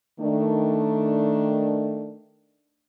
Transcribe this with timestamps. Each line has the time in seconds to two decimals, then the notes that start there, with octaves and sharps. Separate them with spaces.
0.21 D#3 A3 D4